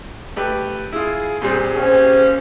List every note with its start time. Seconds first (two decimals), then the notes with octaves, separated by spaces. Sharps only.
0.36 A3 G4 B4
0.92 E4 F4 G#4
1.42 A#2 G3 C4
1.76 A#3 C#4 G4 C5